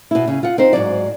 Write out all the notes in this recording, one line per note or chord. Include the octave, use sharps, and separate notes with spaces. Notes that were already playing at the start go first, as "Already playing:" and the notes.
B2 E4
C#3
F4 F#5
C4 D#4 C5
G#2 C3 F#3 D5